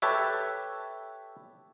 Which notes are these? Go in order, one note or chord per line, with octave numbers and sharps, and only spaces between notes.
G4 A4 B4 C#5 E5